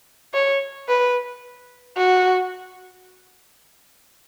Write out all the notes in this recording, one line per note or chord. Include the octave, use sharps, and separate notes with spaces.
C#5
B4
F#4